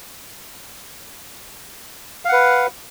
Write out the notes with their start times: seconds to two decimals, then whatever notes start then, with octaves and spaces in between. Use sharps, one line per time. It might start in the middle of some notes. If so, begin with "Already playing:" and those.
2.25 F5
2.29 F#5
2.33 B4